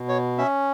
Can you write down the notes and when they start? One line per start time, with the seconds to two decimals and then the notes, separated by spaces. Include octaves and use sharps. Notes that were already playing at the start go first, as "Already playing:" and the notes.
Already playing: B2
0.09 C#5
0.38 C#4 E5